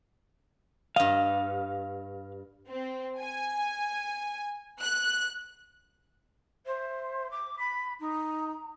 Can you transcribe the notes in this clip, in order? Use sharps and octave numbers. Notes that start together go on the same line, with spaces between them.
G2 D#5 F5
C4
G#5
F#6
C5 E5
D6
B5 B6
D#4 A#5